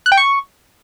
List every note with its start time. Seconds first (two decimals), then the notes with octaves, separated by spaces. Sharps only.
0.06 F#6
0.12 G5
0.17 C#6